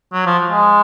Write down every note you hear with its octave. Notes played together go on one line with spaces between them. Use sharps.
F#3
F3
G#3